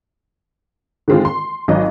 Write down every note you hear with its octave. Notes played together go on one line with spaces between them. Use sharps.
D3 D#3 G#3 C4 F4
C6
G#1 F#3 D#5